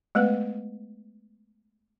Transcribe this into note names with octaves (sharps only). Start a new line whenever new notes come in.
G#3 A3 B3 B4